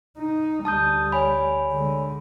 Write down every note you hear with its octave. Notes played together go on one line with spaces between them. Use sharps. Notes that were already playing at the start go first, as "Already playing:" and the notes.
D#4
D2 G3 A5 D#6 G6
C#5 G#5 B5
D3 G#3